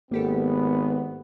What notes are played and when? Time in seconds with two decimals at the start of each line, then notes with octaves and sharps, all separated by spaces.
0.12 G#1 A#3 B3 G4 A4